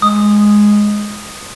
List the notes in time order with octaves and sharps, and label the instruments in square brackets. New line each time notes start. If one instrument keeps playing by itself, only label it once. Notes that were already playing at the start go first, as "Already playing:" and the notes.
[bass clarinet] G#3 [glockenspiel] D#6